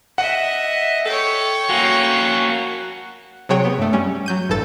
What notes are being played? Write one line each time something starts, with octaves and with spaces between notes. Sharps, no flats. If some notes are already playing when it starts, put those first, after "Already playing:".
D#5 E5 F#5
A4 C#5 G5
A#3 C#4 F#4
C3 F#3 G#4 C#5 G5
B3
G2 A3
G3 C#4
F#3 G6 D#7
A1 G2 A4 A6